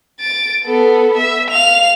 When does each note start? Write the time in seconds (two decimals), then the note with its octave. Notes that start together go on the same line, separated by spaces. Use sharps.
0.20 A6 D7
0.65 B3 A4
1.17 E5
1.51 F5 F7